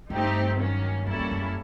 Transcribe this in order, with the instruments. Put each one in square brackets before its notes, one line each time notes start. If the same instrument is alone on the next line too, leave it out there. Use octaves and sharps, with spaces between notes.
[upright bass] G2 [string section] A3 C4 D#4 G4
[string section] D#3 F#3 A#3 C#4
[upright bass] F#2 [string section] G3 A#3 C#4 E4 A4
[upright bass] F2
F#2